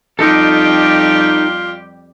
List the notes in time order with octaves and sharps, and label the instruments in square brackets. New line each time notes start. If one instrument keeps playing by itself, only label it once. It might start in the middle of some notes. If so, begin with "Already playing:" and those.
[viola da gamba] F2 G3 G4 [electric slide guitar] D#4 A4 [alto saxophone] F4